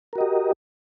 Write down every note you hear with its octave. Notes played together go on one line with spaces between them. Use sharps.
F#4 G4 A#4 D#5